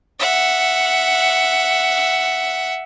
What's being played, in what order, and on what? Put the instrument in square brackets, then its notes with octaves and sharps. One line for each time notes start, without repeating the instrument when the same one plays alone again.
[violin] E5 F#5